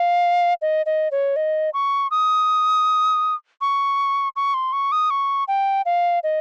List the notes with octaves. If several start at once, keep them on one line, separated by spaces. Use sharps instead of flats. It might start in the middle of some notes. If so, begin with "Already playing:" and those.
Already playing: F5
D#5
D#5
C#5
D#5
C#6
D#6
C#6
C#6
C6
C#6
D#6
C#6
G5
F5
D#5